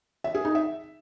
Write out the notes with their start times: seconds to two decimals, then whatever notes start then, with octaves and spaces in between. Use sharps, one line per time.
0.24 E5
0.35 G#4
0.45 D#4
0.55 E5